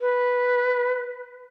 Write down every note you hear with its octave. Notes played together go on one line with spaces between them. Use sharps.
B4